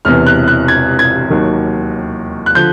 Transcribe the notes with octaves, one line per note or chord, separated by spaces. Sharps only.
E1 E2 C3 E3 F6
F#6
F#6
G#6
G#6
D#2 D#3 F#3
F#6
D3 F3 G6